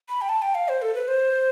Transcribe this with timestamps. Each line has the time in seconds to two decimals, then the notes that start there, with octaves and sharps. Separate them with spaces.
0.09 B5
0.21 G5
0.29 A5
0.42 G5
0.55 F5
0.68 C5
0.82 A4
0.95 B4
1.08 C5